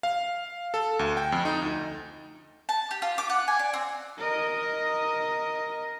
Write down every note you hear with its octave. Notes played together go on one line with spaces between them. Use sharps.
F5
A4
D2
G5
F2
D#4
D2
A5
G4
F4
D6
F#5
G#5
D5
C4
A#4 D#5